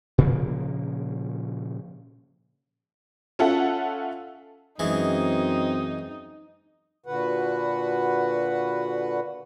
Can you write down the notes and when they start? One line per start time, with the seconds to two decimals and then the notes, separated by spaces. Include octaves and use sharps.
0.18 A#2 C#3 F3 A#3
3.39 C#4 F4 A4 E5 F#5
4.79 F#2 E3 G#3 C4 D#4
7.06 A#2 D3 F#4 B4 F#5